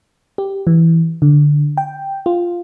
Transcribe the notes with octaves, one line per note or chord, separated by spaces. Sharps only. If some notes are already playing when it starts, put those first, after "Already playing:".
G4
E3
D3
G5
F4